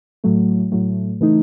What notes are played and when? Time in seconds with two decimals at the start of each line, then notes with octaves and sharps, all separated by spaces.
0.24 A2 F#3 A3
0.72 A2 F#3 A3
1.20 C#3 E3 A3 D#4